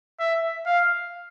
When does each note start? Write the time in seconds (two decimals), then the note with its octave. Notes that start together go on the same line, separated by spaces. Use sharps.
0.20 E5
0.66 F5